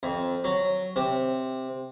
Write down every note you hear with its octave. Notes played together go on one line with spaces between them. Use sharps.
F2
F#3
C3